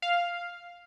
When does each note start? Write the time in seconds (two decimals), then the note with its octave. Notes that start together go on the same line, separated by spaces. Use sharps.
0.02 F5